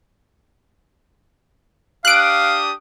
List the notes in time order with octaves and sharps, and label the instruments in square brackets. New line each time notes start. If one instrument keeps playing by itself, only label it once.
[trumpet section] D4 G4 D#6 [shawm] F5 [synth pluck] F#6 D7